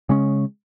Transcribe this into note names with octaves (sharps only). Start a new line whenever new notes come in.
C#3 G#3 C#4